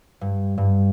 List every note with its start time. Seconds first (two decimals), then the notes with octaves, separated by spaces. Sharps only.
0.21 G2
0.58 G2